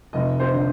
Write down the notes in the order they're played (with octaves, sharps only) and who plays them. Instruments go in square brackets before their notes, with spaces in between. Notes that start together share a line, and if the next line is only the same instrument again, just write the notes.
[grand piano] F1 [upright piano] D#5
[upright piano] C5
[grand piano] D3